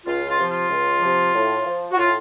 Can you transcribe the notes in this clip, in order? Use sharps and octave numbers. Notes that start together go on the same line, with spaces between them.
C#2 F4
F4
C3 F3
F4
C#2
C3 F3
A2
F3
F#4
A2 F4